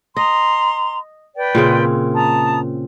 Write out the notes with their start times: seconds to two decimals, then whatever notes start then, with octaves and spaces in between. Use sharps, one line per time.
0.17 D#5 A#5 C6
1.36 B4 D5 G5
1.55 A#2 C#3 C4
2.15 A5 A#5 D#6